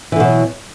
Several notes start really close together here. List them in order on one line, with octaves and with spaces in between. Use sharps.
E3 D3 B2 F#3